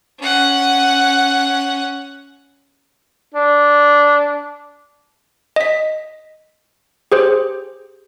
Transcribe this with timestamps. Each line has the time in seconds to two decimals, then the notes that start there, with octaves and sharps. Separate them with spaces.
0.20 C#4 F#5
3.34 D4
5.56 D#5 B6
7.12 G4 G#4 C5